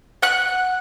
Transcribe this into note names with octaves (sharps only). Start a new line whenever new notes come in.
F#5 F#6